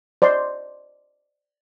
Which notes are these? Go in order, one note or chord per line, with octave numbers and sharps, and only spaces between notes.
C5 D5 D#5 C6